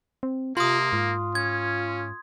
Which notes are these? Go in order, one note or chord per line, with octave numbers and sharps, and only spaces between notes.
C4
C3 A#3 F4 C6 D#6
G#2 F4
C#4 G#6